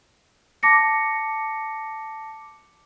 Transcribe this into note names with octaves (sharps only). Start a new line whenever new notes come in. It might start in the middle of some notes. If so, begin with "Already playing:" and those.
A5 D6 A#6 C#7